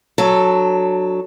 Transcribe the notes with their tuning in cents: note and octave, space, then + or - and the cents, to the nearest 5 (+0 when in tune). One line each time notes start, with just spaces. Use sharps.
F#3 +0 D4 +20 A4 +0